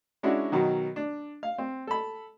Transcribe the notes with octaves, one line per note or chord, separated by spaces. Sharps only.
G#3 C#4 D4 E4 F#4
B2 D#3 F#3
D4
F5
C4
A4 B5